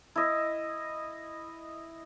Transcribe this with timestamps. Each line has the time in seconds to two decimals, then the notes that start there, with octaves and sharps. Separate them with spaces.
0.16 E4 D#5